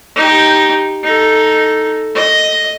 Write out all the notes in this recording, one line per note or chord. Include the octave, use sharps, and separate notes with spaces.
D#4 G4
D#4 A4
D#5